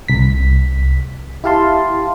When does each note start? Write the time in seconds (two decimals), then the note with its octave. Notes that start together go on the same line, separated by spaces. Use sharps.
0.08 C2 B6
1.44 E4 G4 F5 A5 C6